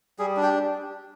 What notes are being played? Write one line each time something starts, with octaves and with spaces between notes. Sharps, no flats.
G3 G#4
D4
G4